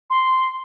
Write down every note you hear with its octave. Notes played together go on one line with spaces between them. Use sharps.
C6